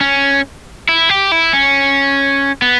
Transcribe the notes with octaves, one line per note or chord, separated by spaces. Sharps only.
C#4
E4
G4
E4
C#4
B3